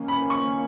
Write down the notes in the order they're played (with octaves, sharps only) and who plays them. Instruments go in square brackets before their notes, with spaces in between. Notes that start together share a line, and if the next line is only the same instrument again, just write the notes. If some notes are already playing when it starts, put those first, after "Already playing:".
Already playing: [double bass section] D#3 A#3 C#4
[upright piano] B5
C#6